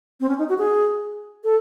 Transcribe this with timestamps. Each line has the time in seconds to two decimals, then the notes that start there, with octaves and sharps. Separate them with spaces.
0.20 C4
0.29 C#4
0.38 D#4
0.49 F#4
0.58 G#4
1.44 A4